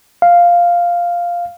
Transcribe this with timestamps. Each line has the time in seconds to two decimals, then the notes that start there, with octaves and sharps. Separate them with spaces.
0.22 F5